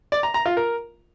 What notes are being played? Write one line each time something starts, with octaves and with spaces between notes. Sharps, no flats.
D5
A#5
A#5
F4
A#4